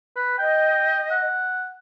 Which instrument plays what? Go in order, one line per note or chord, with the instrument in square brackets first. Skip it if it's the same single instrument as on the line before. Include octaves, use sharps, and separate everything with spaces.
[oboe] B4
[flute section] D#5 [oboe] G5
[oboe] F#5